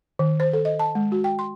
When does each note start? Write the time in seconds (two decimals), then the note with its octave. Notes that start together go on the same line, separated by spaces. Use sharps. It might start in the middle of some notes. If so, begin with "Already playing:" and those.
0.19 D#3
0.40 C5
0.53 A4
0.65 D#5
0.79 A5
0.95 G#3
1.12 F#4
1.24 G5
1.39 C6